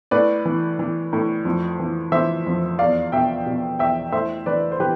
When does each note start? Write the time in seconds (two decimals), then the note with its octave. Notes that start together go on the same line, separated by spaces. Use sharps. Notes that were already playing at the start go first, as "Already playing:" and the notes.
0.11 A2 B4 D5
0.45 E3
0.79 E3
1.13 A2
1.45 F2
1.80 E3
2.12 E3 C5 E5
2.47 F2
2.79 E2 D5 F5
3.12 B2 E5 G5
3.46 B2
3.79 E2 E5 G5
4.12 A2 C5 E5
4.46 E3 B4 D5
4.72 C5
4.80 E3 G4 B4